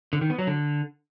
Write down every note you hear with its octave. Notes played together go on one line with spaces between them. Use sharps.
D3
D#3
B3
F#3
D3